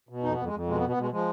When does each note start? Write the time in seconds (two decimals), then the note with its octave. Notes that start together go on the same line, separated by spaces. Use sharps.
0.09 B2
0.23 F2 D#4
0.35 F2 B3
0.45 G#3
0.53 F2
0.67 B2 G#3
0.78 B3
0.82 B2
0.89 B3
0.97 B2 G#3
1.11 F3 G#3